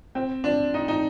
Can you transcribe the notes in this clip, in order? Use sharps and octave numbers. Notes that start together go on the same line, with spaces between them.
C4
D4
D#4
D#4